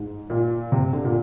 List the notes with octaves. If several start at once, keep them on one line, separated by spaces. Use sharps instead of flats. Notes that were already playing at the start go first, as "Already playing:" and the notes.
Already playing: G#2
A#2
C3
D3
A#2